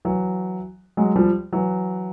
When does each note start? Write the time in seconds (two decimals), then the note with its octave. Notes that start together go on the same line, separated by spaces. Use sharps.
0.05 E3 F#3
0.97 F#3 G#3
1.16 F3 G3
1.53 E3 F#3